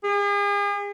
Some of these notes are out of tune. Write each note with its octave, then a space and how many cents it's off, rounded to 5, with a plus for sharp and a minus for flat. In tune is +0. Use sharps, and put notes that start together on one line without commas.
G#4 -40